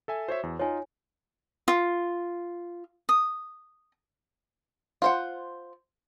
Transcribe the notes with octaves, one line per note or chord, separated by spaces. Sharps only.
A4 E5 G#5
F#4 C5 C#5 E5
E2
D#4 F4 C#5 G#5
F4
D#6
F4 C5 F#5